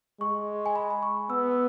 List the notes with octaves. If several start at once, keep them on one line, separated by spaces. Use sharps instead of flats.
G#3 C#6
G#5
B5
B5
C#6
B3 E6
E6